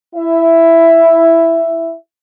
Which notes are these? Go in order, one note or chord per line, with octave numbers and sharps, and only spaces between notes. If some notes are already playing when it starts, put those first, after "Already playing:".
E4 E5